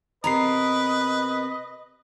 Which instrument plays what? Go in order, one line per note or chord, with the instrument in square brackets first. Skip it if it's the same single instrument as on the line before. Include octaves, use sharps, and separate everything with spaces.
[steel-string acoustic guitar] C3 B3 A#4 [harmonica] B4 [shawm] D#5 [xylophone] A#5 C7